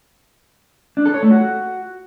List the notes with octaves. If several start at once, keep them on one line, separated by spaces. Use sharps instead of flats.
D4
A4
C#5
A3
F#4